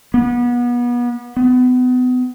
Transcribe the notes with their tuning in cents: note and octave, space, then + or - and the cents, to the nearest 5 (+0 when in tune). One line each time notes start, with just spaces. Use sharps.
B3 -30
B3 +30